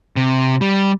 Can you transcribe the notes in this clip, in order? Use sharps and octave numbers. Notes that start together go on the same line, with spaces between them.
C3
G3